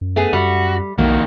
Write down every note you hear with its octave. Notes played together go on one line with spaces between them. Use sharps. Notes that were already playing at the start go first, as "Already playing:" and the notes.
F#2
A3 B3 G#4
F#2 G3 F#4
B1 F2 D#3 A#3 F#4